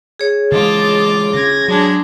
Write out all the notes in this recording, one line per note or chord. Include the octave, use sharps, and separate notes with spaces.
G#4 C#5
C#3 E3 G#3 F4 D#5 A5 D6
C#3 G#6 A#6
F#3 G#3 D4